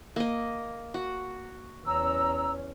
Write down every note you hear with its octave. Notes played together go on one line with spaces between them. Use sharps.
A#3 D#5
F#4
E2 C#4 A#5 E6